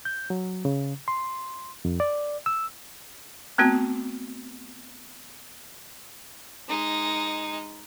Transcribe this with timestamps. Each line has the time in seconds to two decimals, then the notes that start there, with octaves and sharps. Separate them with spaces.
0.05 G6
0.30 F#3
0.65 C#3
1.08 C6
1.85 F2
2.00 D5
2.46 E6
3.58 A3 B3 C4 F#4
6.68 G#3 D#4